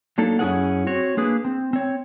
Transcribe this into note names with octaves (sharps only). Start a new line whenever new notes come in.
F#3 A#3 D4 D#4 A4
F#2 C#4 E4 G#4 A#4 F#5
C4 F#4 C#5
A#3 D4 G#4 B4
C4
C4 C#5